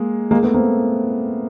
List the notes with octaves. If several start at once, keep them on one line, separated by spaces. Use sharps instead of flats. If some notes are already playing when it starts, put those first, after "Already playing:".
Already playing: G#3 A#3
G#3 A#3
A3 B3
A#3 C4